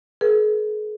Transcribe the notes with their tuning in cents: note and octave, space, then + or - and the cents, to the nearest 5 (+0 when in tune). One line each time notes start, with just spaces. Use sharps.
G#4 +40 B4 -45